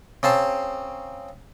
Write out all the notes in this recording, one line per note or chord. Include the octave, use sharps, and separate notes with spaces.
C#3 C4 A5